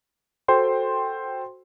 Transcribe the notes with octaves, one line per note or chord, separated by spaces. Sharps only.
F#4 A4 C5 G5 C6